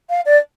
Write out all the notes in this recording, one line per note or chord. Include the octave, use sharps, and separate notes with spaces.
F5
D5